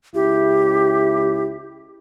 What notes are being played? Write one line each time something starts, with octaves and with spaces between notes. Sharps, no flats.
C#2 E4 G4